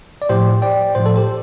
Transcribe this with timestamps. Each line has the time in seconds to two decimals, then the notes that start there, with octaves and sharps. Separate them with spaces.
0.22 D5
0.29 A2 F3 G4 C5
0.62 D5 G5
0.95 A2 F3 C5
1.06 A4
1.16 G4 C5